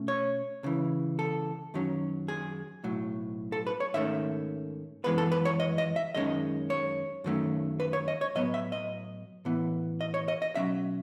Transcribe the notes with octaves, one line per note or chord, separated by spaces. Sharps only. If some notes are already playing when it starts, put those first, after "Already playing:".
Already playing: B2 A3 C#4
C#5
C#2 C#3 E3
A4
F#2 D#3 F#3 C#4
G#4
B1 A2 F#3
A4
B4
C#5
G#2 D#3 A3 C#4 E5
F#2 E3 G#3 B3 B4
A4
B4
C#5
D#5
D#5
E5
F#2 D#3 G#3 C#4 D#5
C#5
F#2 D#3 F#3 A3 C#4
B4
C#5
D#5
C#5
A2 F#3 B3 D#5
E5
D#5
A2 E3 B3
D#5
C#5
D#5
D#5
B1 B2 F#3 C#4 E5